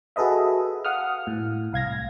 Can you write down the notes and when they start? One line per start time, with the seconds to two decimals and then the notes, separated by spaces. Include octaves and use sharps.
0.16 F#4 G#4 A4 B4 D#5 E5
0.85 F5 F#5 D#6 F6
1.27 A2
1.73 C2 F5 G#6 A#6